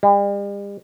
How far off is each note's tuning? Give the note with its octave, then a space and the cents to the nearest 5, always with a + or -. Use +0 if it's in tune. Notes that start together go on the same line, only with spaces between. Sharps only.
G3 +45